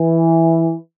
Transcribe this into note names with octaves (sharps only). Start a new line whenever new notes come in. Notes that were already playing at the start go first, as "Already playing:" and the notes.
Already playing: E3